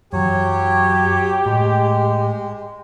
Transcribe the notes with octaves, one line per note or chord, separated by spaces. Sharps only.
F#2 E3 F#3 G4 C#5
A2 G#3